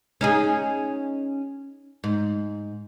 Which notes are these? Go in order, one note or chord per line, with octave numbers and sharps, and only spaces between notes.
C#4 D#4 G#4
G#2